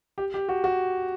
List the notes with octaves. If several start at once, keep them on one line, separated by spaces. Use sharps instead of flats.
G4
G4
F#4
F#4